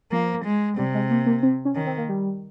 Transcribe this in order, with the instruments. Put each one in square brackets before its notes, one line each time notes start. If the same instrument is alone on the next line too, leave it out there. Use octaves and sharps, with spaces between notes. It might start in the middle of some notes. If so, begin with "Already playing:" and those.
[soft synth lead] F3 [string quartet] A#3
[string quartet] G#3
[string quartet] C3 [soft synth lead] G3
[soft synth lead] G#3
A#3
A#3
C4
C#4
[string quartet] D#3 [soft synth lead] C#4
[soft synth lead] C4
A#3
G3